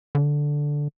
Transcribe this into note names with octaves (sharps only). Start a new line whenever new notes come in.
D3